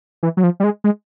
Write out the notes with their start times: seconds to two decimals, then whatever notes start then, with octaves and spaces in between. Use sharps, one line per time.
0.23 E3
0.37 F#3
0.44 F3
0.60 G3
0.64 G#3
0.84 G#3